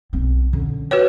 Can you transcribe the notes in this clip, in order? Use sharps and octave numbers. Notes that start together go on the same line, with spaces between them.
B1 C4
D3 C#4
F#4 B4 C#5